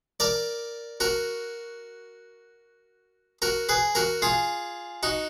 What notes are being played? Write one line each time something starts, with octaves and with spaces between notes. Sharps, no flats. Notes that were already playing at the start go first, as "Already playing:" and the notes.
A#4 D5
F#4 A#4
F#4 A#4
G#4 B4
F#4 A#4
F4 G#4
D#4 F#4